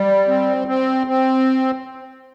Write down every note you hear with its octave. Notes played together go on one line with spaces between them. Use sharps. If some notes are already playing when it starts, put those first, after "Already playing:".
Already playing: G3
C4
C4
C4